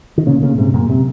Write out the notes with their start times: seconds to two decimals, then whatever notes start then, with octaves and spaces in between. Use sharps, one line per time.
0.18 D#3
0.26 A#2 C#3
0.42 A#2 C#3
0.58 G#2 C3
0.74 F#2 A#2
0.90 C3